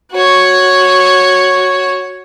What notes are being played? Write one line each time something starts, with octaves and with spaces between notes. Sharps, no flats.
F#4 C#5